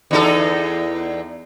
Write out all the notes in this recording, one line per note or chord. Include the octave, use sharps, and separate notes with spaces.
E2 D#4 A4